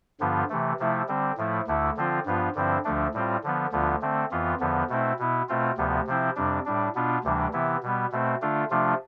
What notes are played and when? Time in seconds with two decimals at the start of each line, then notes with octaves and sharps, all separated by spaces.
0.20 G2 D3 F3 B3 F4
0.49 C3 E3 A3
0.79 C3 F3 A3 E4
1.08 D3 G3 C4
1.37 A2 F3 A3 E4
1.67 D2 D3 A3 E4
1.96 D3 F3 C4 F4
2.25 G2 F3 B3 F4
2.55 G2 D3 F3 C4 E4
2.84 D2 D3 F3 A3 D4
3.14 A2 G3 C4 F4
3.43 D3 F3 B3
3.72 D2 D3 F3 B3 F4
4.01 D3 A3 C4
4.31 F2 E3 B3 F4
4.60 E2 D3 F3 B3
4.89 B2 A3 C4 E4
5.19 B2 B3 E4
5.48 B2 A3 C4 F4
5.77 D2 C3 F3 B3
6.07 C3 F3 C4 E4
6.36 F2 C3 G3 D4
6.65 A2 G3 D4
6.95 B2 B3 D4 F4
7.24 D2 C3 E3 G3 D4
7.53 C3 E3 B3 E4
7.83 B2 G3 B3
8.12 B2 A3 C4
8.42 D3 A3 D4 F4
8.71 C3 F3 A3 D4 F4